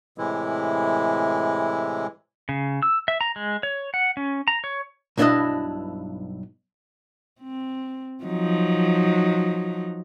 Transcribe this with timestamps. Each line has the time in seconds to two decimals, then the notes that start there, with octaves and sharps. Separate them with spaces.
0.18 A2 C3 E3 G#3 E4
2.49 C#3
2.82 E6
3.08 E5
3.21 A#5
3.36 G#3
3.63 C#5
3.94 F#5
4.17 C#4
4.48 A#5
4.64 C#5
5.17 B1 G2 D4 E4 B4 D#5
7.41 C4
8.24 F3 F#3 D#4